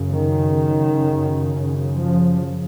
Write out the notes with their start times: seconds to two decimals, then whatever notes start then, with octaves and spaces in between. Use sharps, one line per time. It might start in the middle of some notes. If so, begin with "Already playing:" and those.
Already playing: F#2 C#3
0.12 D#3
1.96 F3